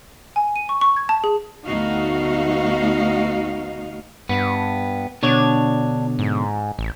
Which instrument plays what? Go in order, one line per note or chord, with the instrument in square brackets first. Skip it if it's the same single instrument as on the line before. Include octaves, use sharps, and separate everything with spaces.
[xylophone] G#5
D#7
C#6
C#6
G#6
A5
G#4
[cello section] D2 A3 B3 D#4 F#4 F5
[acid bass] G2 [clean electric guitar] B3
[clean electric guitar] B2 D3 C#5 [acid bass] D4
[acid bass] G#2
A1